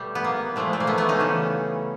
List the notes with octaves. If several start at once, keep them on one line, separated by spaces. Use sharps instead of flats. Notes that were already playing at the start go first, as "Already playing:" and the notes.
Already playing: B2 G3 A3
B3
A#3
A#2 F3 G#3 A3
A3
A#3
A3 B3
A3 B3
C#4 D#4
C#3 E3 G3